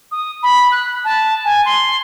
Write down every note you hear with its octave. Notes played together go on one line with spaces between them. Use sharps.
D#6
B5
F#6
A5
G#5
C6